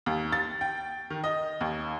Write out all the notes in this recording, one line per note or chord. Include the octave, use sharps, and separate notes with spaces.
D#2
A6
G5
D#3
D#5
D#2